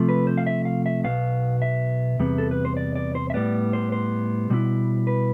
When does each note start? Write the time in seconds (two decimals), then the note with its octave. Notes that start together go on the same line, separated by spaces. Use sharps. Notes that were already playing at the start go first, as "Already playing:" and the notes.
Already playing: C3 F3 A3
0.09 B4
0.27 C5
0.38 F5
0.47 E5
0.65 F5
0.86 E5
1.03 B1 B2 B3 F5
1.62 E5
2.19 E2 C3 G3 B3
2.38 A4
2.51 B4
2.65 C5
2.77 D5
2.95 D5
3.15 C5
3.30 E5
3.34 A2 G3 B3 D5
3.73 C5
3.92 C5
4.50 B2 G3 B3 E4
5.07 B4